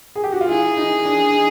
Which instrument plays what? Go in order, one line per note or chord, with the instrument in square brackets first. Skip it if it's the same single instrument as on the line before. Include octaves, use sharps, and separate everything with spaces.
[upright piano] G#4
G4
F#4
F4
[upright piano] E4 [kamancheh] G#4
[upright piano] D#4
D4
D#4